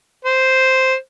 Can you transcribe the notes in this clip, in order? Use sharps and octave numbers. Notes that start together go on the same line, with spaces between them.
C5